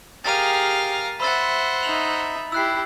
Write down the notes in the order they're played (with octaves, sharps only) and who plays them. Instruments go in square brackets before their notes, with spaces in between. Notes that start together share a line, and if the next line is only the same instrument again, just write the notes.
[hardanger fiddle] G4 G#4 [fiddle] A#4 F5 [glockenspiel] A6 D#7
[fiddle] C5 F#5 [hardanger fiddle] E5 [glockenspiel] B5 E6 A6
[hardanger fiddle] D#4 E5 [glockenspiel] F7 F#7
[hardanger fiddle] E4 G4 [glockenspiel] E6 F#6 C7